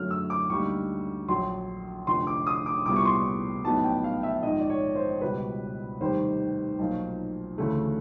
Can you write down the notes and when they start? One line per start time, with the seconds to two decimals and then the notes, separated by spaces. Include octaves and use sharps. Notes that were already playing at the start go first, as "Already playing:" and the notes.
Already playing: F#2 D3 F#3 A3 F6
0.11 E6
0.30 D6
0.50 D2 D3 G3 A#3 D#4 C#6
1.28 A#1 A#2 F#3 C6
2.07 F1 F2 D3 C6
2.27 D6
2.46 D#6
2.66 D6
2.86 C2 A#2 G3 B3 E4 D6
2.96 C#6
3.05 C6
3.16 C#6
3.64 A#1 A2 F#3 B3 D#4 A5
3.84 G5
4.04 F5
4.23 E5
4.43 A#1 G#2 D#3 D#5
4.60 D5
4.70 C#5
4.95 C5
5.21 C#2 B2 G3 B4
6.00 F1 D#2 D#3 G3 C5
6.79 B1 A#2 F3 A#3
7.58 D2 C#3 E3 A3